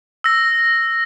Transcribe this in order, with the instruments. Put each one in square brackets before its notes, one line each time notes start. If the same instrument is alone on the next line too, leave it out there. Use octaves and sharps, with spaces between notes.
[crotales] E6 A#6